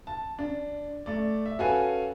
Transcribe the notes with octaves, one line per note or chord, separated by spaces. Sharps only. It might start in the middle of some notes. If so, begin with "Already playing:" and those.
A5
D4
A3 D5
E5
C#4 F#4 A4 B4 F5 G#5